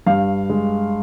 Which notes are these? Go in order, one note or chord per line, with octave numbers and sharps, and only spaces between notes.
G2 F5
G#3